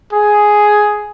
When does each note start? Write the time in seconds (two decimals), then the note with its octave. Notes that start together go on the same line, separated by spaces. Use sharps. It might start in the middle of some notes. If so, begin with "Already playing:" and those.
0.13 G#4